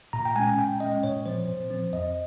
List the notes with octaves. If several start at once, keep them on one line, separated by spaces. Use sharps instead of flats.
A#2 A#5
G5
G#3 C#4 G#5
A#2 G5
G#3 C#4 D#5
A#2 C#5
F3 C4 C5
A#2
F3 C4
F2 D#5